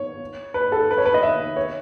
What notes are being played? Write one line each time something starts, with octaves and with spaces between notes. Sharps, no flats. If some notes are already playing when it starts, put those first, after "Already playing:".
Already playing: C#5
B4
A4
B4
C#5
B4
D#5
E5
C#5